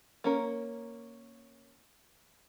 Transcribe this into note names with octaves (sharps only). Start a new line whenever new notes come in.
A#3 C#4 A#4